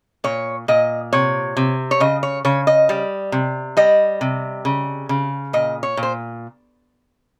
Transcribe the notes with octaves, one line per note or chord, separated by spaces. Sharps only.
A#2 C#5
A#2 D#5
C3 C#5
C3
C#5
C#3 D#5
C#5
C#3 C#5
D#5
G3
C3
G3 D#5
C3
C#3
C#3
A#2 D#5
C#5
A#2
C5